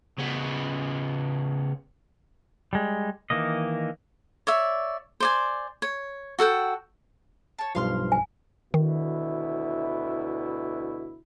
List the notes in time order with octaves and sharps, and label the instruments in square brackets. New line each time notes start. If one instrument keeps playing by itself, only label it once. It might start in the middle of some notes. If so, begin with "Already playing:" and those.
[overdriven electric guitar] C#3 B3
[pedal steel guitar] G3 G#3
D#3 E3 A#3 D#5
[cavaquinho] C#5 D5 E5
C5 D5 G#5
C#5
F#4 A4 F#5 G5
[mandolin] C#5 A5
[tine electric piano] B1 G2 F3 [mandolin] F5 C6 F6
[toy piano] G#5
[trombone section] D2 B2 E4 [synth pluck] D#3